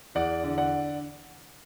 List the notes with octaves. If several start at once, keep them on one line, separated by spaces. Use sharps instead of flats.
E2 D5 F#5
D3
D5 F#5